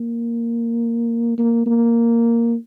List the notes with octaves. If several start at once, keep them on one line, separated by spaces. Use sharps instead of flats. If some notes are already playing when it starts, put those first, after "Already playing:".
Already playing: A#3
A#3
A#3